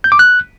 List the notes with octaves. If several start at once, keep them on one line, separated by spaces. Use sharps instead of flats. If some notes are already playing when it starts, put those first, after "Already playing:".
G6
D6
F#6